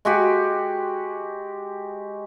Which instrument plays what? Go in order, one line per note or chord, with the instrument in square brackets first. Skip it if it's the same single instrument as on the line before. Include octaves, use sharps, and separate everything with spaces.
[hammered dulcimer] G#3 F#4 G4